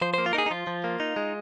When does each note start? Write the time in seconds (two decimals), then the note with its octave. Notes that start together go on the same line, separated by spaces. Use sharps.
0.01 F3 C5
0.14 A#3 C5
0.26 F4
0.33 D#4 A#4
0.38 G#4
0.46 D#4
0.51 F3 F4
0.67 F3
0.84 A#3
1.00 D#4
1.16 G#3